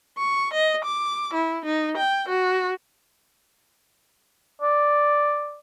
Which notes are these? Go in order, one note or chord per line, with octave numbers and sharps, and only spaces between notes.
C#6
D#5
D6
E4
D#4
G5
F#4
D5